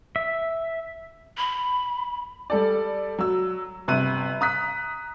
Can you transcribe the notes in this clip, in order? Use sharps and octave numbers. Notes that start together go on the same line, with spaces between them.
E5
B5
G3 A4 D5
F#3 E6
G1 C3 F#6 D#7
A#5 D#6 F#6 B6